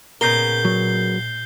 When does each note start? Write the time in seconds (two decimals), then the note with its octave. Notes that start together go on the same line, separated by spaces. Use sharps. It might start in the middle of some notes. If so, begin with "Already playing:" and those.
0.21 A#2 C#3 B3 A#4 G6 C7 G7
0.65 F#3